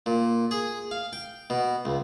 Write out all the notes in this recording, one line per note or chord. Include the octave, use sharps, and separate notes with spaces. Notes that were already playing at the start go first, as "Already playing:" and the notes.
A#2
G#4
F5
G5
B2
C#2